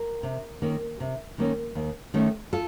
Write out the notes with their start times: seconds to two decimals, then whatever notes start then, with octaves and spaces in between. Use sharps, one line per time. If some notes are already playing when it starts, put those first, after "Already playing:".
Already playing: A#4
0.23 C3
0.62 D#3 A#3 C#4
1.00 C3
1.38 D#3 A#3 C#4
1.75 D#2
2.14 D#3 A3 C#4
2.53 F4 A4